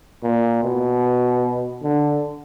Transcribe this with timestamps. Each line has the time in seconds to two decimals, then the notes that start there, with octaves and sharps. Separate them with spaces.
0.23 A#2
0.63 B2
1.83 D3